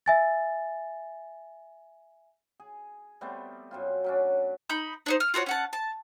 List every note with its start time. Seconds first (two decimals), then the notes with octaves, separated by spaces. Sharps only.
0.06 E5 G#5 A6
2.60 G#4
3.21 G3 A3 B3 C4
3.71 F#2 C4 F4
4.04 F#3 C#4 D4
4.70 D#4 B5 G6
5.06 D4 D#4 C5
5.20 F6
5.34 F4 F#4 A4 C#5
5.46 C#4 F#5 A5
5.73 A5